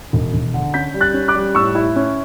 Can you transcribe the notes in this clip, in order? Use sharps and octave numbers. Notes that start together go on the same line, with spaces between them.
E1
E1
D3
C#4 G6 B6
G3
F#6 A6
C#4
D6 F#6
G3
A2 C#6 E6
E4
C#4